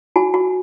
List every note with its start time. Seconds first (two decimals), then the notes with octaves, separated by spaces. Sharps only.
0.16 F#4 G#5
0.34 F#4